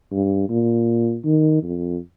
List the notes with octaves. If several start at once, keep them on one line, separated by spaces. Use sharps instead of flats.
G2
A#2
D#3
F2